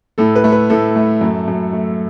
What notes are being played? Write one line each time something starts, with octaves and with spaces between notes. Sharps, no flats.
A2 A4
B4
A3
B4
A2 A4
A3
F#2
F#2
A3